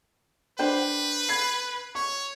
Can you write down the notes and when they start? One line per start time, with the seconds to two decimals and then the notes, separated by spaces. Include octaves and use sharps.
0.59 D4 B4 C5 G5
1.29 B5 G#6 C7
1.95 C#5 C#6